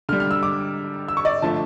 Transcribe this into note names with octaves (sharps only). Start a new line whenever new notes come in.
D3 G3 F6
F6
E6
D6
E6
C#6
D5
D3 F3 A3 A5